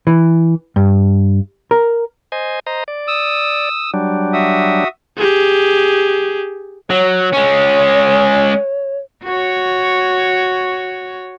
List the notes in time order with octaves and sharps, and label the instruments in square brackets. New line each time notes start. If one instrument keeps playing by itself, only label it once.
[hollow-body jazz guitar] E3
G2
A#4
[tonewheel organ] C5 D#5 G#5
C5 D#5 A#5
D5
[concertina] D#6 E6
[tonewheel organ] F#3 G3 D4
[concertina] F#4 E5 D#6
[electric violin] G4 G#4
[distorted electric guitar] F#3 [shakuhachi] C#5
[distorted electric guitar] G#3 C#4
[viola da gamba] F#4 C#5